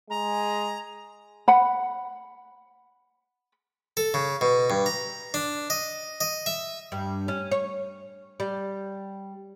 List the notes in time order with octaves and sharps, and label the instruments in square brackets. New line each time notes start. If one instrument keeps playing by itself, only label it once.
[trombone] G#3 [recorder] A#5
[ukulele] F#5 B5
[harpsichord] A4
C#3
B2
G2
A#5
D4
D#5
D#5
E5
[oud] G2
C#4
C#5
G3